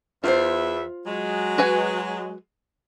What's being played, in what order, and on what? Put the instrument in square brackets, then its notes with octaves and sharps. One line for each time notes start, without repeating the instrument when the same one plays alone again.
[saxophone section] E2 E5 [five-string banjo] F4 C5
[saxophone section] F#3 G#3
[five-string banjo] F#4 B4 G#5